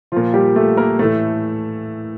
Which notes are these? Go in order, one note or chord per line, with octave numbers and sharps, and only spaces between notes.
A#2 F3 F4
G3 G4
A3 A4
A#3 A#4
A2 E3 A3 A4